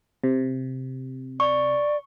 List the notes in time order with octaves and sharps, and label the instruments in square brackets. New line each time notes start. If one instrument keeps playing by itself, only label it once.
[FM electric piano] C3
[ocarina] D5 [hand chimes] C#6